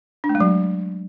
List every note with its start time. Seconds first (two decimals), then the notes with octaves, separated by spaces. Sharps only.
0.24 D4
0.29 A3
0.35 G#3
0.40 F#3